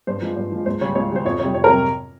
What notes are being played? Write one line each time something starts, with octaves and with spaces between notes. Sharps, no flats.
G2 C5
F3 G#3
G2
F3 G#3
C#2 C5
C#3 G3 C#5
C#2 C#5
C#3 G3 C5
F2 C#5
C3 G3 C#5
F2 C#5
A#4
C3 G3